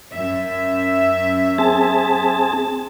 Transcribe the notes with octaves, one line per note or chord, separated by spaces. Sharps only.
F#2 E5
C4 G#4 A5